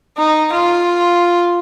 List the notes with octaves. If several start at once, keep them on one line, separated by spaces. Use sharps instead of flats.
D#4
F4